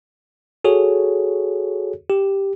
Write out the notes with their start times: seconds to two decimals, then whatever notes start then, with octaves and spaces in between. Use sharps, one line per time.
0.64 F#4 G#4 A4 C#5
2.10 G4